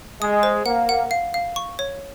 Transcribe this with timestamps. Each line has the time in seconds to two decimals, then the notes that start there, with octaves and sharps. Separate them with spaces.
0.21 G#3 D#6
0.43 C5
0.66 A#3 F#5
0.89 F#5
1.11 F5
1.34 F5
1.56 C#6
1.79 C#5